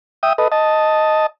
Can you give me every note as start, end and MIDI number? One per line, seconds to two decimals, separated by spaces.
0.23 0.33 76
0.23 0.33 79
0.23 0.33 87
0.38 0.48 69
0.38 0.48 71
0.38 0.48 75
0.52 1.26 75
0.52 1.26 81